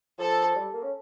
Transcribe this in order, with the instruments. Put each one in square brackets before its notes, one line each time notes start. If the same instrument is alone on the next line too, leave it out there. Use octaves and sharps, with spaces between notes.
[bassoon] F3 [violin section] A4
[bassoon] G3
A#3
C#4